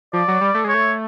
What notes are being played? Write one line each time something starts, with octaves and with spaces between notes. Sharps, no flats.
F3 D5
F#3
G3
A3
G#3 C#5
A3